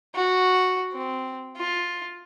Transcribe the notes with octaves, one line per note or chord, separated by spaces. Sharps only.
F#4
C4
F4